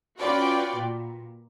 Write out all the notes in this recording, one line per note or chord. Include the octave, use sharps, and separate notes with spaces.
C#4 F4 F#4 B4 D5 G5
A#2